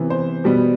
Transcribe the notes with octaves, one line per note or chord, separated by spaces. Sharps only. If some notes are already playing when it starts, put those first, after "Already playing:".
Already playing: C3 E3 B3
C5
B2 G3 B3